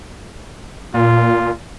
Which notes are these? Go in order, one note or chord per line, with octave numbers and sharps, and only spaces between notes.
A#2 F4